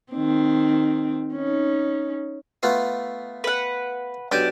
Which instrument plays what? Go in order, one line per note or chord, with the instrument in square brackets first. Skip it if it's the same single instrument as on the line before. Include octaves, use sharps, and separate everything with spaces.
[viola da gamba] D#3 C4
C#4 D#4
[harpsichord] A3 B3 F4
[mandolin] B4 F#5
[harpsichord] B1 G4 G#5 [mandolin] D4 D5 G6